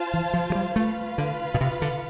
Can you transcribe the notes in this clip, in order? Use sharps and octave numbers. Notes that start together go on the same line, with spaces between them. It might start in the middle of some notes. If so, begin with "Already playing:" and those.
Already playing: F4 C5 F5 A5
E3
F3
F3
G3
A3 F4 B4 F5
D3
B2
C3
D3